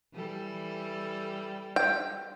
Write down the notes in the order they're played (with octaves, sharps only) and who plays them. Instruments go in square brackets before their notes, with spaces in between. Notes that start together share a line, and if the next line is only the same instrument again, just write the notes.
[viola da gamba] E3 G3 A4
[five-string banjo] G5